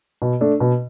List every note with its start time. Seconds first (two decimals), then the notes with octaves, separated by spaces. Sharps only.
0.22 B2
0.41 A3 D4
0.60 B2